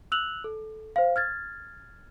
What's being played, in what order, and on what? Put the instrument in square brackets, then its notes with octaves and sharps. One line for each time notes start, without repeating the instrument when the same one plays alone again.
[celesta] E6 F#6 F7 F#7
A4
C5 F5
F6 G#6 A6